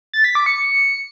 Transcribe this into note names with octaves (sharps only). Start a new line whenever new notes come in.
A6
B6
D6
C#7